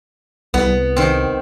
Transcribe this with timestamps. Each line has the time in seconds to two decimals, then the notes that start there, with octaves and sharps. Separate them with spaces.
0.54 C2 B3
0.96 D#3 C4